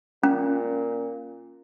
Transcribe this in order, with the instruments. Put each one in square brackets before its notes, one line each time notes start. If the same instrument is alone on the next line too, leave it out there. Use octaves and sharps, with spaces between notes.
[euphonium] A#2 [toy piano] C#4